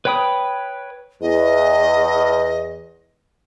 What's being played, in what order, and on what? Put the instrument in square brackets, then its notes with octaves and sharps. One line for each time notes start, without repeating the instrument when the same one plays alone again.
[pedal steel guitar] B4 C#5 G5 B5 D#6
[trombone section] E2 [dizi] D#5